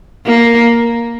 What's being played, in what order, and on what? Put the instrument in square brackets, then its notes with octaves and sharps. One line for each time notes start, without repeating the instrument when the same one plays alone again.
[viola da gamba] A#3